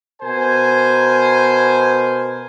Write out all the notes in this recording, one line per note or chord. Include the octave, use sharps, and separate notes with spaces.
B2 A#4 C5 G#5